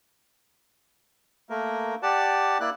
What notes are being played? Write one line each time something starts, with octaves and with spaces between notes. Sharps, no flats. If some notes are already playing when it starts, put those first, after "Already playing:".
A3 A#3 A#4
G4 D5 F#5 A5
A#3 E4 D5 F#6